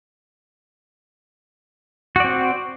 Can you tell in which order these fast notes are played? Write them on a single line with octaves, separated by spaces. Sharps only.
F#4 D5 C4